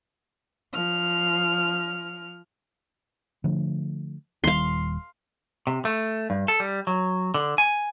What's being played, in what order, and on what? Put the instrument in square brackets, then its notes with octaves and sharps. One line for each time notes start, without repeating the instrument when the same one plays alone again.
[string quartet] F3 F6
[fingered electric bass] D3 F3 A3
[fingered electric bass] D#1 D#3 G3 [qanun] F5 C6
[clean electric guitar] C3
A3
G2
A4
G3
F#3
D3
G#5